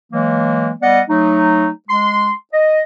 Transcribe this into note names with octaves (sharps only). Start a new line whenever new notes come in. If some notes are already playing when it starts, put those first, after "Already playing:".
E3 F#3 G#3 A#3
G3 B3 D5 D#5 F#5
F#3 A3 D#4
G#3 C6
D#5